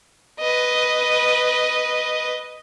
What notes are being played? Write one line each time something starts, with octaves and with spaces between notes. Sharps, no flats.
B4 D#5